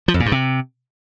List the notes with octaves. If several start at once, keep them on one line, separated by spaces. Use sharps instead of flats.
F3
F2
A#2
G2
C3